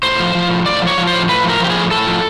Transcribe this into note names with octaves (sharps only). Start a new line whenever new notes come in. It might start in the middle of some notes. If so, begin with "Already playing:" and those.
A2 C5
F3
F3
A2
A2 D5
F3 C#5
F3
C5
A2
A2 B4
F3
A#4
F3 G4
G#4
A2
A2 A4
F3